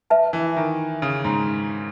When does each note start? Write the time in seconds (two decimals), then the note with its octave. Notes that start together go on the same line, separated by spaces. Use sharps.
0.10 B4 E5 A5
0.33 E3
0.57 D#3
1.02 C#3
1.25 G#2